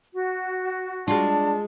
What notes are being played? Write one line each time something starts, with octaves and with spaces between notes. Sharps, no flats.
F#4
G#3 D4 F4 A5